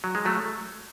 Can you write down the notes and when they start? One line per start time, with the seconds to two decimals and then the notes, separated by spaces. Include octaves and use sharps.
0.04 F#3
0.15 G#3
0.25 F#3 A3